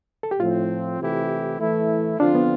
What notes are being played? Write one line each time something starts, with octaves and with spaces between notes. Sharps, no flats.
A4
G4
A2 F3 C4 F4
C3 E3 A3 E4 G4
E3 A3 E4
D3 F3 C4 D4 F4
B3